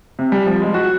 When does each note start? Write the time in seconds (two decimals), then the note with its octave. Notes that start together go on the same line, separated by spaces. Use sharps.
0.19 C3
0.32 G3
0.46 F3
0.62 G#3
0.74 F#4